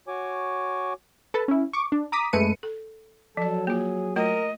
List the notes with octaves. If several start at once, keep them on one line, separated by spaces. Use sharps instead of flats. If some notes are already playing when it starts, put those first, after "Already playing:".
F#4 C#5 G#5 D6
A4 B4 A5
C#4 E4
C#6 D6
D4
A#5 D6 D#6 B6
F#2 G#3 A3 B4 C#7 D#7
A4
F3 F#3 A4 D5
A#3 F4 G#4
A3 F4 A#4 D#5